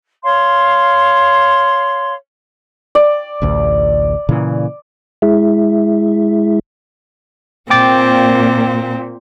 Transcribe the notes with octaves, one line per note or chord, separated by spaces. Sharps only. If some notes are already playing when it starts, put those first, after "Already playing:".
C#5 F5 C6
D5
A1 D2
A#2 C#3 E3
G#3 E4
A#2 C4 G5 D6 A6